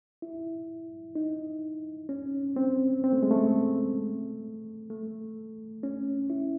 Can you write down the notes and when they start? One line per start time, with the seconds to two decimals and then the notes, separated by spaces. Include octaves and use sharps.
0.22 E4
1.15 D#4
2.09 C#4
2.56 C4
3.04 C4
3.13 A3
3.23 G#3
3.31 A3
4.90 A3
5.83 C#4
6.30 E4